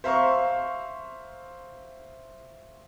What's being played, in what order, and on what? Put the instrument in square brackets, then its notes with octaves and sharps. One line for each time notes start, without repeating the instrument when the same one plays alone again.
[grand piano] C5 E5 F5 A#5 C6 C#6